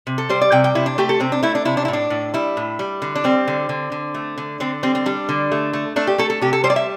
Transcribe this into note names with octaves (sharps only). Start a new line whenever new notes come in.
C3
A4
G3 C5
D5
C3 G5
G5
C3 E4
D4
A3 G4
A4
C3 C4
D4
A3 E4
D4
C3 E4
D4
E4
A2
D4
A2
G3 E4
A2
G3
D3
D4
G3 C4
D3
D3
D3
A3
D3
D3 C4
G3 C4
C4
G3 D4
D3
A3
A3
A3 D4
G4
A3 A4
A4
C3 G4
A4
G3 C5
D5
E5